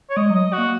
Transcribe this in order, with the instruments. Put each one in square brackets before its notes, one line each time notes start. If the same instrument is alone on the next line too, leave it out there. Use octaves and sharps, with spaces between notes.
[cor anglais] C#5
[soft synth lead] G#3 [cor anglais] D#5
[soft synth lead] F#3 [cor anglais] D#5
[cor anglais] F#4
[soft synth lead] A#3